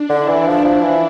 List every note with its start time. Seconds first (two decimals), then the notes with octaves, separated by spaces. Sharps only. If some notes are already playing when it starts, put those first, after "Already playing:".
Already playing: D4
0.09 D3 E4
0.28 E3
0.47 F3
0.65 F3
0.83 E3